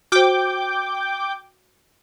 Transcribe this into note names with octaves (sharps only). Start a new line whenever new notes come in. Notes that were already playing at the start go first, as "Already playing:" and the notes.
F#4 C5 G5 D6 G6